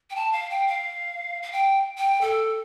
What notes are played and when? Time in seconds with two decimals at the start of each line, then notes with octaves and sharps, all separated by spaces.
0.10 G5
0.16 A5
0.32 F5
0.50 G5
0.67 F5
1.43 F5
1.52 G5
1.97 G5
2.21 A4